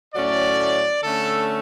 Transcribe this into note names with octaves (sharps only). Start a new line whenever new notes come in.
A2 F#3 A3 C#4 D5
D3 A3 C#4 A4